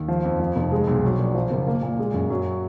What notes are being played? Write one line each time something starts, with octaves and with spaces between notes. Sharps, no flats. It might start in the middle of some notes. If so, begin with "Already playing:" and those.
Already playing: D#2
F3
F2
F3
F1
G#3
B1
F#3
A#1
F3
F#1
A#3
A#2
G#3
F#2
F#3